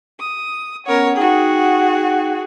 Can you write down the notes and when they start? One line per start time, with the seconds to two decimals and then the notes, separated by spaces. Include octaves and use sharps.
0.20 D#6
0.86 B3 C#4 A#4 C#5 F#5
1.16 D#4 F#4 G#4 F#5 G5